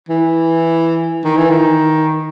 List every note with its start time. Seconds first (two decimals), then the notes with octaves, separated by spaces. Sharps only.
0.09 E3
1.24 D#3
1.37 E3
1.50 D#3